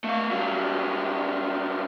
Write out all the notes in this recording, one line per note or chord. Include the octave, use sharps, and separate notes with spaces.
A3 F5
G2 F#3